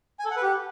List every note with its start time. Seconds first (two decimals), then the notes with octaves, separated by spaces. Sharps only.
0.19 G#5
0.25 A4
0.31 F#5
0.37 B4
0.42 G4